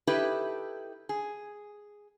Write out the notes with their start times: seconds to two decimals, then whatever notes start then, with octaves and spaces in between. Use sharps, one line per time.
0.07 D#4 E4 G4 A4 B4
1.09 G#4